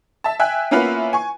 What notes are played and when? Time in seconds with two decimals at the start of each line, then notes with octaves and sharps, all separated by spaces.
0.24 E5 A5
0.40 E5 G5 G#5 F#6
0.71 A#3 B3 C#4 E4 F4 B4
1.13 G#5 C#6